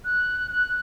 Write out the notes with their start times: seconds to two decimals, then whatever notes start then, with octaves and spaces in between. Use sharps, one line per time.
0.05 F#6
0.51 F#6